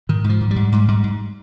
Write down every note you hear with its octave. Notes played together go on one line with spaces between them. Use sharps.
G#2 D#3
G#2
F3
G#2
G3
G#2
G#2
G#2
G#2